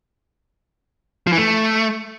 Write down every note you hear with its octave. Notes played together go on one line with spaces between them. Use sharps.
F3
E3
A3